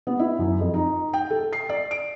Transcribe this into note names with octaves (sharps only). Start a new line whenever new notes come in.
B3
E4
F#2
F2
D#4
G5
A4
C7
D5
D7